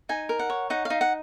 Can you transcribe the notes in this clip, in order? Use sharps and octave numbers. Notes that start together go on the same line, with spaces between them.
D#4 G#5
A#4
F#5
C#5
D#4 F#5
F5
D#4
F#5